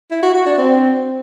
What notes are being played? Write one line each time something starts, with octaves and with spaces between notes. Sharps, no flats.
E4
F#4
F#4
D4
C4